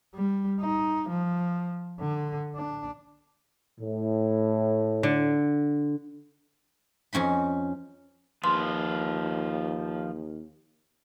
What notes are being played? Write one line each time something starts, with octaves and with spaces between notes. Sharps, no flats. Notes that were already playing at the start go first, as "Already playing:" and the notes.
G3
D#4
F3
D3
D4
A2
D3
F2 C#4 D#4 B5
D#2 F3 F4 B4 C6